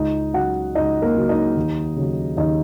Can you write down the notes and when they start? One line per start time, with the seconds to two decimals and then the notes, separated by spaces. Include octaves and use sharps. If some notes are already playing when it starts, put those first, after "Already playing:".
Already playing: C#2 D#4 D#5
0.34 C#3 F#3 F#4 F#5
0.75 C#2 D#4 D#5
1.02 A#3 A#4
1.15 C#3 F#3
1.29 D#4 D#5
1.57 D#2
1.96 C#3 F#3
2.37 D#2 D#4 D#5